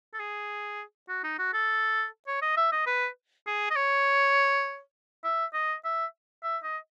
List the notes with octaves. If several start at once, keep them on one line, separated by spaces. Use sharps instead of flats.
A4
G#4
F#4
D#4
F#4
A4
C#5
D#5
E5
D#5
B4
G#4
D#5
C#5
E5
D#5
E5
E5
D#5